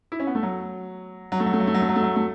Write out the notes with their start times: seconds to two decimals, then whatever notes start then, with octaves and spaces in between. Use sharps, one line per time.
0.12 E4
0.20 C#4
0.27 B3
0.35 A3
0.43 F#3
1.32 F#3
1.40 A3
1.46 F#3
1.53 A3
1.60 F#3
1.67 A3
1.74 F#3
1.82 A3
1.89 F#3
1.96 A3
2.03 F#3
2.16 A3